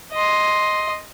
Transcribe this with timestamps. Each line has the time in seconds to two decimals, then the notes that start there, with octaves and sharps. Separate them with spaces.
0.13 D#5 C6